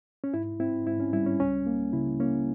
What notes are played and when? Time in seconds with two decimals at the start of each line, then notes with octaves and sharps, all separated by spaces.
0.24 C#4
0.34 G#2 E4
0.60 C4 E4
0.87 G#2 E4
1.00 C#4
1.13 G3 E4
1.26 C#4
1.40 C#2 C#4
1.67 A#3
1.93 C#3 E4
2.20 A#3 C#4